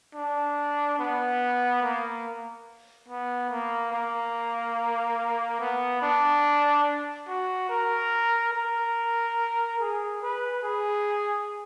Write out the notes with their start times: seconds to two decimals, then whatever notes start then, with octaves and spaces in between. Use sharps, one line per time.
0.15 D4
0.99 B3
1.82 A#3
3.08 B3
3.50 A#3
3.92 A#3
5.60 B3
6.02 D4
7.28 F#4
7.69 A#4
8.53 A#4
9.80 G#4
10.22 B4
10.63 G#4